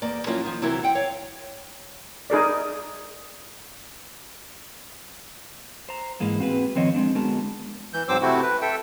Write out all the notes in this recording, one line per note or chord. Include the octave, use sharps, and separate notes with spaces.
E2 A#3 D5
F3 F#3 A#3 C#4 E4 F4
D#3 F3
C3 E3 F#3 C4 E4 A#4
F#5 G5
C#5 F5
D#4 G#4 A#4 D5
C5 A#5
G#2 E3 G#3 A#3
C4 F#4 G#4 B4
D#3 F3 C4 C#5 D#5
G#3 C4 D4
D3 G#3 B3 F#4 A#4 A5
E3 G6
G#2 F#3 C4 C5 D6 E6
C3 A3 C4 E4 F#4
B4
A4 E5 G5